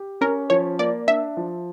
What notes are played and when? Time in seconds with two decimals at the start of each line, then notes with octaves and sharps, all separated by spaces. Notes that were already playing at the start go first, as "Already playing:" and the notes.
Already playing: G4
0.21 C#4 A#4
0.50 F3 C#5
0.79 A#3 D5
1.07 D4 E5
1.37 F3